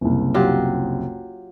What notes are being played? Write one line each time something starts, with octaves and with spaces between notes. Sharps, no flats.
F#1 C2
F#3 F4 G4